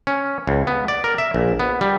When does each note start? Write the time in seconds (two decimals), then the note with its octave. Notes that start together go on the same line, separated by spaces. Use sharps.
0.07 C#4
0.47 C#2
0.67 B3
0.88 D5
1.04 A#4
1.18 E5
1.34 A#1
1.59 B3
1.81 G3